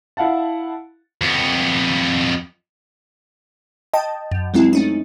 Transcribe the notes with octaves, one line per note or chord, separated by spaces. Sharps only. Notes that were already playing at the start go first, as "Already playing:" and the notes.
E4 F5 F#5 A5
F2 B3
D#5 G5 A5
F#2
F#3 G#3 C4 E4
A3 C#4 D#4